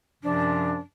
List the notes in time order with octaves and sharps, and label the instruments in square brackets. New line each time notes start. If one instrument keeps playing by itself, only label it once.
[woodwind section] F#2 C3 F3 [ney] D4